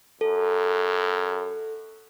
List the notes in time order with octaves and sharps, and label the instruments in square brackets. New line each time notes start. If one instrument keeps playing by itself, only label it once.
[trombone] F#2 [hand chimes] A4